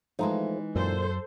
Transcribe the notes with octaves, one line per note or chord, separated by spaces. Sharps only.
E3 F3 G#3 A3 D#4 A#5
F#2 A#2 A4 C5